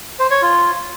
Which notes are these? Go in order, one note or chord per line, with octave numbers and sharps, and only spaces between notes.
C5
C#5
F4